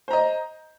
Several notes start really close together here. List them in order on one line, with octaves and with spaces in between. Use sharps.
C5 A#5 D#5